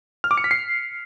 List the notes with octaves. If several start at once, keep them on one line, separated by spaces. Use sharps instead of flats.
F6
D6
C#7
B6
C7